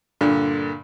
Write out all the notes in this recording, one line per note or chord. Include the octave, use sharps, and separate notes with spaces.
G2 A#2 D3